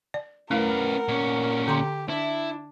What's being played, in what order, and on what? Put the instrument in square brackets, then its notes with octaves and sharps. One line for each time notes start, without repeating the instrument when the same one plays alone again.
[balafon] D5
[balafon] A3 E4 F5 [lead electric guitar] C#4 B4 [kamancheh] A#4 F#5
[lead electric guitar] A#2 C#4
[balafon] D3 A#5 C6 [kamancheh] G4
[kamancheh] D4 [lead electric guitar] E4